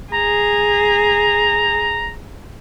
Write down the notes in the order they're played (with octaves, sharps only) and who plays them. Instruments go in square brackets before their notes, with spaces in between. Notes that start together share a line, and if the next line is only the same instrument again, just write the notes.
[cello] G#4 [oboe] A#5